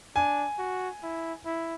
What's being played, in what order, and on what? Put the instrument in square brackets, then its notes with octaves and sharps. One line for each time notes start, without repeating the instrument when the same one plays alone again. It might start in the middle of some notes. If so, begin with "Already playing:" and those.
[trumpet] D4 [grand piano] G#5
[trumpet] F#4
E4
E4